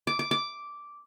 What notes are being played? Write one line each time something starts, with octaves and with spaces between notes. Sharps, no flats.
D6
D6
D6